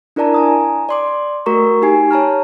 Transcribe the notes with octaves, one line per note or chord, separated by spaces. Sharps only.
D4 E4 A#4 D5 A5 A#5
G#5 A#5 D#6
D5 C6 D6
A3 F#4 A#4 A#5 C#6
D#4 G4 G#5 C7
C#5 A5 A#5 F6